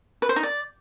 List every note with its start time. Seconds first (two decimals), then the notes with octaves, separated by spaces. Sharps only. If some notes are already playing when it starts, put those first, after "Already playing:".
0.22 B4
0.29 C5
0.36 D#4
0.43 D5